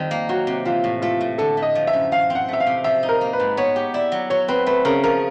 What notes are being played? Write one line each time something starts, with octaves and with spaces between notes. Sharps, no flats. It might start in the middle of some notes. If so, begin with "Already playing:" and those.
Already playing: F2 D#3 G3 C4
A#3
F#3 F#4
C3
E3 F4
A2
A3 F4
A2
D3 A4
A3
D#5
F3
E5
F#2
E3 F5
C4
F#5
A3 E5
F5
C3
F3 E5
D#4
A#4
A#3
B4
G#2
B3 C#5
G4
E4 D5
F#3
F#3 C#5
C4 B4
A3 B4
C#3 A#4
F3 A#4